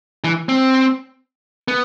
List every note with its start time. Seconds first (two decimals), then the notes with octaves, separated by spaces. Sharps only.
0.24 E3
0.49 C4
1.68 B3